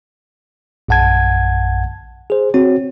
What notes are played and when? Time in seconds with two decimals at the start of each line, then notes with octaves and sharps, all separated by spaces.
0.88 A#1 F#2 F#5 A5 G#6
2.30 G#4 C5
2.54 C4 F#4 C#5